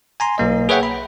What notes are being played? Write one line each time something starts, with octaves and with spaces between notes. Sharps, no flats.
G#5 A#5 C6
B1 A#3 D#5
G#4 B4 C#5 E5 F#5 G5
B5